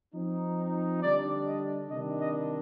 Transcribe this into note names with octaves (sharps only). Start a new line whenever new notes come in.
F3 C4 D#4
D3 G3 D4 D5
D#5
C3 D#3 G3 D4 D#5
D#5